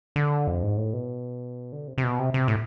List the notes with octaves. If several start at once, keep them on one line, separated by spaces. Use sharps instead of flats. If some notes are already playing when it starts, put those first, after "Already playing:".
D3
F2
G#2
A2
B2
D3
C3
C3
B2
C3
C3
A2